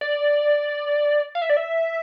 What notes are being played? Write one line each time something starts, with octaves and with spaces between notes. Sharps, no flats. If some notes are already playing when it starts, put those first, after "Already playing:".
D5
F5
E5
D5
E5